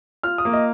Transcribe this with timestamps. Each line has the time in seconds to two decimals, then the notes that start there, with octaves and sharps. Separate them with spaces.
0.23 F4 F6
0.38 D#6
0.45 A#3
0.53 D#5